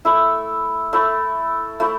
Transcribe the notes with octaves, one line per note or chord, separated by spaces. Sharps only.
A3 E4 E5
A3 E4
A3 E4